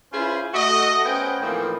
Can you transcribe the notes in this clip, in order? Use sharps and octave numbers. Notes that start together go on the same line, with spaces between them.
C#4 E4 F4 G#4 B4 C5
A3 F#4 D#5
B3 C#4 G#4 C5 G5
A2 E3 F3 A#3 C4 D#4